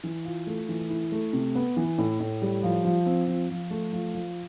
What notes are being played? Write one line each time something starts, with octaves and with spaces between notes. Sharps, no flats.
E3
F4
A3
E3
E4
A3
C3
B3
E3
A2
A2
G3
F3
F3
C4
F3
F3
A3
F3
F3